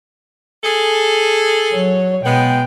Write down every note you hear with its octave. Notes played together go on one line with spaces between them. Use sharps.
G#4 A4
F#3 C#5
B2 G#3 B3 G5